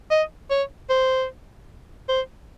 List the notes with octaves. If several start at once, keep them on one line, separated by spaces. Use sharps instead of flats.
D#5
C#5
C5
C5